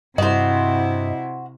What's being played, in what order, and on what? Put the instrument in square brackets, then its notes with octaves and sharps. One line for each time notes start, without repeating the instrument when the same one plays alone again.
[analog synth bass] G2 [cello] C3 E4 [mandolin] F#4 C5 [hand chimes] D#5